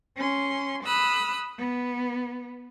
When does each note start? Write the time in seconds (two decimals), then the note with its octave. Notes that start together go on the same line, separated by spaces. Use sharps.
0.15 C#4 C6
0.83 B5 D#6 E6 F#6
1.57 B3